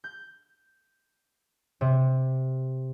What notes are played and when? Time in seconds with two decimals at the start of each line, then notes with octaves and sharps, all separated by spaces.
0.04 G6
1.81 C3